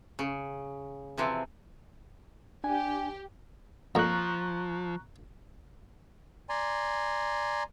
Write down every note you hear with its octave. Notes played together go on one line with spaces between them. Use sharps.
C#3
C3 E3 F3
D4 G4 G#5
F2 A#2 F3 A#5 C#6 F#6
D5 G#5 A#5 C6